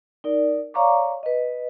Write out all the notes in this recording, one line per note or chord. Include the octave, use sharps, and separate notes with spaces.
D#4 A#4 D5
C#5 D5 F5 A#5 C#6 D6
B4 D#5